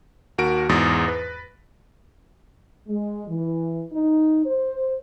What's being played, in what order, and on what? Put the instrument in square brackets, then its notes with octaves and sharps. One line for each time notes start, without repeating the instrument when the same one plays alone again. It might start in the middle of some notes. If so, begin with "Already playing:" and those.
[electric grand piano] D#2 F#4 A#4 D7
E2 G#2 D#6 A6 A#6
B4
[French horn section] G#3
E3
D#4
C5